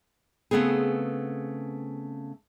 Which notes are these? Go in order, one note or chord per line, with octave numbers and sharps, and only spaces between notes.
C#3 A3 B3 C4 G#4